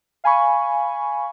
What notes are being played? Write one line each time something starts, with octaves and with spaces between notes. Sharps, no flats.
F5 G#5 B5 C#6